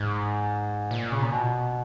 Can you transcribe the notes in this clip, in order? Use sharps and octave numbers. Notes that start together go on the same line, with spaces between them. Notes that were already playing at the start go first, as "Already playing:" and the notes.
Already playing: G#2
A#2
C#3
A#2
B2